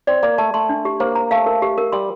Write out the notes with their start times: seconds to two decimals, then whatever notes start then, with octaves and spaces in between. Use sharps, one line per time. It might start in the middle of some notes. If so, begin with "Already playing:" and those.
0.07 C4 D5
0.23 A#3 D5
0.38 A3 A5
0.54 A3 C6
0.69 D4
0.85 G4
1.00 A#3 C5
1.15 A#5
1.31 A3 F5
1.46 A#4
1.62 G4
1.78 A#4
1.92 G3 C6